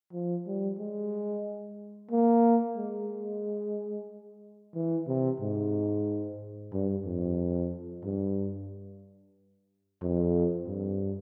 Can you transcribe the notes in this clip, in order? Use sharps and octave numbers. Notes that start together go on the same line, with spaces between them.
F3
G3
G#3
A#3
G#3
E3
C3
G#2
G2
F2
G2
F2
G2